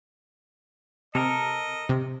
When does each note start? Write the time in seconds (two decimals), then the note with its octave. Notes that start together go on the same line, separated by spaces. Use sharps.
1.15 C3 A4 A#4 D#5
1.89 C3